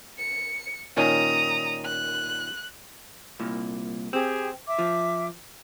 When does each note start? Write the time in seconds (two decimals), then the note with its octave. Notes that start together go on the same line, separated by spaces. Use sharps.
0.18 C#7
0.97 A#2 D#3 C#4 A#5 D#6
1.85 F#6
3.39 C2 A#2
4.13 C4 G4 G#4
4.67 E5 D6
4.79 F3